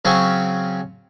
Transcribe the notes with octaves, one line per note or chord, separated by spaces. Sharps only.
C#3 F#3 C4 C#4